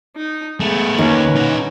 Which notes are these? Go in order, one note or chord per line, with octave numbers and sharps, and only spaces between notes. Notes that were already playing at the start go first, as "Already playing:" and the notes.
D#4
G#3 A3 B3
D#2 D#3 A#3 C#4 B4
D#4 F#5